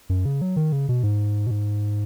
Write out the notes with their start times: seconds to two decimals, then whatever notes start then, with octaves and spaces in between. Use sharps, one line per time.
0.09 F#2
0.25 C#3
0.42 F#3
0.56 D#3
0.72 C#3
0.89 B2
1.03 G#2
1.47 B2
1.51 G#2